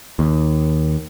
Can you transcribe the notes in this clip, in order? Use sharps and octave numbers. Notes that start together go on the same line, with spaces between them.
D#2